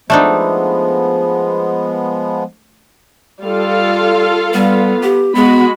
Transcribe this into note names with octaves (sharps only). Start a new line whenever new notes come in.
F3 G#3 A3 B3 D4 D#4
G3 F4 A4 F5
G3 B3
G4
G#3 B3 F#4 B5